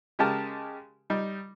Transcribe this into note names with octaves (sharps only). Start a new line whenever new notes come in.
C#3 G#3 G4 A#4 A5
G3 D#4